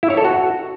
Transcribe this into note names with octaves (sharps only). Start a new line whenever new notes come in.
E4
C#5
A4
F#4